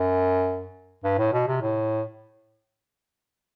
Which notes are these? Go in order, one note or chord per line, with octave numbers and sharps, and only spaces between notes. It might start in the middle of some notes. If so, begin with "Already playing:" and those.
Already playing: F#2
G2
A2
B2
C3
A2